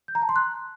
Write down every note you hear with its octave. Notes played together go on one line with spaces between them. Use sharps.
G6
A#5
A5
C6
F#6